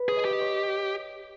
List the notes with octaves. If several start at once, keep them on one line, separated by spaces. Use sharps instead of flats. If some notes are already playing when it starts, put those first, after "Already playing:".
Already playing: B4
G#4 C#5
D#5
G4
D#5
C#5